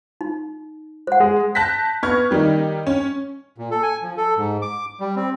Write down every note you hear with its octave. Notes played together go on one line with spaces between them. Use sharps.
D#4
C5 F#5
G#3 G#4
A5 F#6 G6 A#6 B6
B3 C#6 F6 G#6
D#3 G3 A#3 D#4
C#4
A#2
A4
G#5
F3
A4
G#2
D6
G3
C4